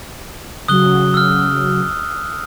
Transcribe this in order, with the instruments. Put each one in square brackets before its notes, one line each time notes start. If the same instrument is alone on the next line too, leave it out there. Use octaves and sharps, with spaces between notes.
[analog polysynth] C#3 F#3 F#4 [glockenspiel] D#6 F#6 G7
[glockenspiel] E6 F6